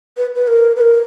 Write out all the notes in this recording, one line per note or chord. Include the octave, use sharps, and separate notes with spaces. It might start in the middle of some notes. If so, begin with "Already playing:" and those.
B4
B4
A#4
B4
A#4